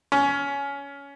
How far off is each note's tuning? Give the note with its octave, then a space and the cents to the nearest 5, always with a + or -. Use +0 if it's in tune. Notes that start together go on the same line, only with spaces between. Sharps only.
C#4 +20